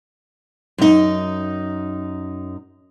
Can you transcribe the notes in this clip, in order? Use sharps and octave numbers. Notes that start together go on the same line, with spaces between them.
F#2 D#4